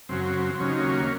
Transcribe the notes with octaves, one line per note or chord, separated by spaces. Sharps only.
F#2 C#3 F#3 C4
C4
C4
D#2 C#3 F#3 C#4
D#4
A#3 C#4
C#4